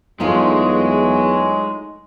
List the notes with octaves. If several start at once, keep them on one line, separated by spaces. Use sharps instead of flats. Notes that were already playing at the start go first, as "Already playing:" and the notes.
E2 F#3 G#3 A3 D#4 F4